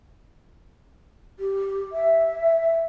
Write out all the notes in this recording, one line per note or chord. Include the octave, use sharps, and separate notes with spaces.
G4
E5